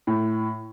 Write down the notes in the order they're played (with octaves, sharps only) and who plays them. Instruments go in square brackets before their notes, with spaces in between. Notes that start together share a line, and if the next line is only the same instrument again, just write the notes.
[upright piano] A2